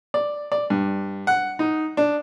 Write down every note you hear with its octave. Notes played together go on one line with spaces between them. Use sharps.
D5
D5
G2
F#5
D#4
D4